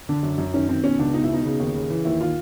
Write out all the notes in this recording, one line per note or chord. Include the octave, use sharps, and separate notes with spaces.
D3 D4
F#2
F#2
D#3 C#4
D#3 C4
B2 C#4
C#2 D4
B2 D#4
E4
B2 D#4
C#3
D#2
C#3
E3
D#2 E4
D#3 F4